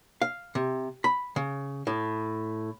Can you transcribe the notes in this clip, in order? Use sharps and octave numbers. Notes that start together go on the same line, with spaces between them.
F5
C3
B5
C#3
A2